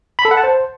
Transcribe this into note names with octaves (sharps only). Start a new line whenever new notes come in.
B5
A4
F#5
A5
C5